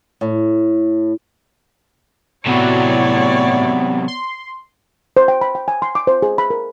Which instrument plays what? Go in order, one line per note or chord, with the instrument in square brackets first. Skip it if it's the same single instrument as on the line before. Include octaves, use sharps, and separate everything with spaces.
[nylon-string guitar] A2
[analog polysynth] A2 F#4 [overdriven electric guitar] C3 F#3 [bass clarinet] B3 [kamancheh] C#5 D5
[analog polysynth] C6
[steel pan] C5
G5
B5
G5
G#5
C6
D6
C5
G#4
B5
A#4